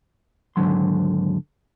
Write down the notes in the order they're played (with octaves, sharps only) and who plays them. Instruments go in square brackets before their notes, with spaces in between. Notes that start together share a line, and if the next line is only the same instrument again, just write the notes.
[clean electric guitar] D#2 G#2 D3 F#3 C6